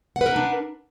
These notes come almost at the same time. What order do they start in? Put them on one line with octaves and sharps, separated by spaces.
F#5 B4 A#4 D#4 D4